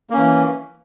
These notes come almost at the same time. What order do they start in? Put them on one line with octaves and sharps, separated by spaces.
A#3 C#4 E3